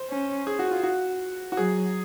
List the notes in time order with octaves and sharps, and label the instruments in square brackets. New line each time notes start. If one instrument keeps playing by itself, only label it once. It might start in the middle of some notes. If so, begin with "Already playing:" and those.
Already playing: [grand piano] C5
[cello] C#4
[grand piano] G#4
F#4
F4
F#4
F#4
[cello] F#3 [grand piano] G#4